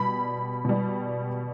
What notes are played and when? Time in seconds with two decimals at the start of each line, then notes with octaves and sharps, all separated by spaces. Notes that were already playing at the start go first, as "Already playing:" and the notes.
Already playing: B2 G3 B5
0.65 B2 G3